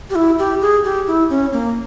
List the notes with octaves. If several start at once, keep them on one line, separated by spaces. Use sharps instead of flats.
G4
E4
G4
G#4
G4
E4
C#4
A#3